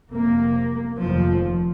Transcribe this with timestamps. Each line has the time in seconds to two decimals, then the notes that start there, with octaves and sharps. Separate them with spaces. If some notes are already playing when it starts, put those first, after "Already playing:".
0.11 F1 F2 C3 A#3
1.01 F1 F3
1.06 D#2